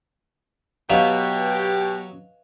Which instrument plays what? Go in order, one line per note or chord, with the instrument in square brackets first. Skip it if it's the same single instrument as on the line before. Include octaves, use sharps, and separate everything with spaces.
[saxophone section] B2 G4 [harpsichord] F#3 [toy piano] B4 D#5 F5